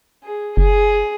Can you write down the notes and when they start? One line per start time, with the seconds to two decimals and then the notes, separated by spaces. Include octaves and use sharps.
0.24 G#4
0.57 F#1 G#4